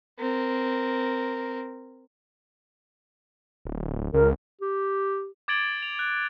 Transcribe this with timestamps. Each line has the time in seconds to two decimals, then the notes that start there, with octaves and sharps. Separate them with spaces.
0.19 C4 A#4
3.65 D1
4.14 C#2 A#4
4.61 G4
5.48 D6 G#6 A6 D7 F#7 G7
5.82 F7
5.99 F#6